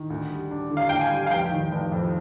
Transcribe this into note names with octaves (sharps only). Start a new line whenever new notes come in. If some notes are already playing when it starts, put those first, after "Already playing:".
Already playing: D#3
D2
G3
D4
D3
F5
D2 G5
G#5
G3
F5
F1 G5
D#3
F1
F2